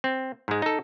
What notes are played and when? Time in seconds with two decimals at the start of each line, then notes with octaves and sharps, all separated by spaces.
0.04 C4
0.48 G#2 G#3
0.62 D#4 A4